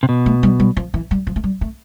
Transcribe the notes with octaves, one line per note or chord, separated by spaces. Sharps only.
C3
B2
A3
G3
G3
F3
E3
G3
F3
A3
G3
A3